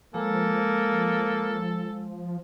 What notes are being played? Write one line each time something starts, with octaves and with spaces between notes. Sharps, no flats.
F3 G#3 A#3 A4